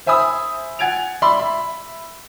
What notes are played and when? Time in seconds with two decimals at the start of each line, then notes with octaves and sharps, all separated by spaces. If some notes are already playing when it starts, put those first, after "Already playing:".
0.06 C5 E5 G#5 B5 D#6 E6
0.79 F#5 G#5 G#6 A6 D7 F7
1.22 D5 E5 B5 C6
1.39 E5 B5